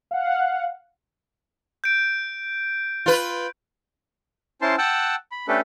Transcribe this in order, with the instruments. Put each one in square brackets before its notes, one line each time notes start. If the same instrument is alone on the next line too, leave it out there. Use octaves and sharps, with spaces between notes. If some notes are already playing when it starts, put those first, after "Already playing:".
[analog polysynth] F5 F#5
[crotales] G6 D7
[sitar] F4 B4
[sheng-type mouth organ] C#4 E4 C5 A5 C6
F#5 G5 A5 E6 F#6
B5
A3 C#4 D4 G4 A4 B4